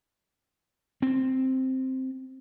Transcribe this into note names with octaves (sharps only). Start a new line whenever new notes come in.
C4